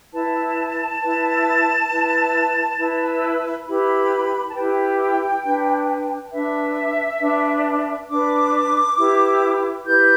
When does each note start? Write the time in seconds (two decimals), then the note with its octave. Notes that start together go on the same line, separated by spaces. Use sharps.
0.12 E4 B4 A5
1.01 E4 B4
1.90 E4 B4
2.78 E4 B4
3.66 E4 G4 B4 B5
4.50 A5
4.55 E4 G4 B4 G5
5.44 D4 B4
6.31 D4 B4 E5
7.20 D4 B4
8.09 D4 B4 D6
8.97 E4 G4 B4
9.85 E4 G4 B4 G6